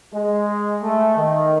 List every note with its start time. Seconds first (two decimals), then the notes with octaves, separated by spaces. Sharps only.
0.14 G#3
0.82 A3
1.17 D#3